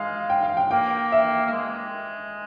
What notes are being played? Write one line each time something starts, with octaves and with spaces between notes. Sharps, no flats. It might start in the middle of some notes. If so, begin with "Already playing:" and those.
Already playing: G#3 F5
G5
F5
G5
A#3 G5
E5
A#3
G#3